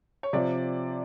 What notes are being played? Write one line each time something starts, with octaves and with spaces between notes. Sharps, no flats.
C#5
C3 F3 D5